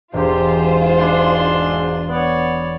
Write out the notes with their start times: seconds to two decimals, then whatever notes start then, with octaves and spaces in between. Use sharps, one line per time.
0.14 E1 G#2 F4 G4 C5
0.97 D4 C6
2.09 B3 C#5 D5